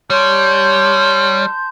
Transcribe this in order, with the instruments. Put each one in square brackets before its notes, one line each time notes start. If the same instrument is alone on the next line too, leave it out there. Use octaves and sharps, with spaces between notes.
[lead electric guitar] G3 [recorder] C#5 [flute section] A5 C6 G6